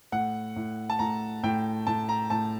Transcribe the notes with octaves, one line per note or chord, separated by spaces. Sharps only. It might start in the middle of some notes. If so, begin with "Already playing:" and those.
A2 F#5
A2
A5
A2 A#5
A2 G5
A2 A5
A#5
A2 A5